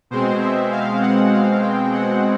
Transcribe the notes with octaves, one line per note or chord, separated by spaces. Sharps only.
B2 G#3 C4 C5
E5
F5
F#5
F5
G5
F#5